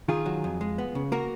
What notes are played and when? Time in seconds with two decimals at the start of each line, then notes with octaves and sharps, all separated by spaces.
0.08 D#3 F4 G#4
0.26 F#3
0.44 F2
0.61 G#3
0.78 B3
0.95 C#3
1.12 A#3 F#4 A#4